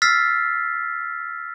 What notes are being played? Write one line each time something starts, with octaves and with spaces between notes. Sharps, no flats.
E6 F6 A6 B6 C7